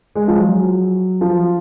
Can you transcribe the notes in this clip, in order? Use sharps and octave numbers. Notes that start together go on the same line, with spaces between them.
G#3
F3
F#3
F3